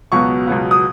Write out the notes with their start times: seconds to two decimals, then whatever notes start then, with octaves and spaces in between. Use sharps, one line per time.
0.12 C#2 B2 F#3 B3 C#6
0.47 C#2 B2 F#3 B3
0.71 D#6